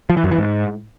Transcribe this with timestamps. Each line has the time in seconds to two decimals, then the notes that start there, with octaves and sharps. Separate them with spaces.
0.10 F3
0.17 E3
0.24 F#2
0.31 E3
0.38 G#2